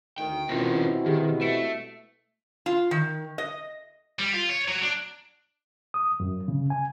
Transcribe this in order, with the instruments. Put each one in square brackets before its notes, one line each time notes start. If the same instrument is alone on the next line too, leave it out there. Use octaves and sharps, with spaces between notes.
[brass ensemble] D2 D#3 [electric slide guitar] G5
[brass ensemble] B2 [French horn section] C4 E4 [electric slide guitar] C#4 F4 A#4
[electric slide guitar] D#3 [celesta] G4 G#4
[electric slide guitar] A3 [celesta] C#7 D7 E7
[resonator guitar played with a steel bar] F4
D#3
D#5
[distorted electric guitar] G3
F4
C#5
F#3
D4
[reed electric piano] D#6
F#2
C#3
G#5